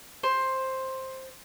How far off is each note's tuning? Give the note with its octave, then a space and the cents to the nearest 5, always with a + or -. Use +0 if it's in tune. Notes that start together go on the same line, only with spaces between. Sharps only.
C5 +10